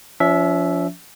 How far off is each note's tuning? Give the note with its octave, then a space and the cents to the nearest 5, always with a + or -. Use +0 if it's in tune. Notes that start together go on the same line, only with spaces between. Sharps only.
F3 +0 C#4 +45 E5 +0